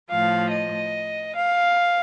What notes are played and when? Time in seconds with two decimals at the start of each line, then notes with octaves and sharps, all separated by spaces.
0.10 A2 F3 F5
0.51 D#5
1.36 F5